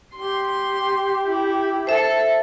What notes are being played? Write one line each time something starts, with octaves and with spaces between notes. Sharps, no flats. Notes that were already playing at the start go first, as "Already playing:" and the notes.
G4 C6
E4
A4 C5 E5